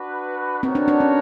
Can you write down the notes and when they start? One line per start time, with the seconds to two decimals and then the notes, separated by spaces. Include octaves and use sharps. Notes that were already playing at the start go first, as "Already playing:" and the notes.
Already playing: D4 F#4 B4
0.63 B3 C4 D#4 F#4 A#4 C#5
0.75 D4
0.88 D4
1.00 C#4